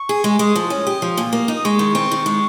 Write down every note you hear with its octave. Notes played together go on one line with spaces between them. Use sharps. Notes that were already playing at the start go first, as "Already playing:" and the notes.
Already playing: C#6
G#4
G#3
G#3 D#6
F3
C#4
G4
F3
A#2
A#3
D#4
D#6
G#3 C#6
D#3
C4
D#3
G#3